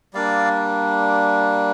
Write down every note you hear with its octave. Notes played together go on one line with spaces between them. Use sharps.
G3 A#3 D4 D5 F5